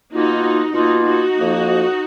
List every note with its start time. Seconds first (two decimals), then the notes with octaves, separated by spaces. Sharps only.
0.13 B2 A#3 D#4 F4 F#4
0.74 B2 A#3 D#4 F4 F#4
1.05 D#4 F#4
1.36 F2 F3 A#3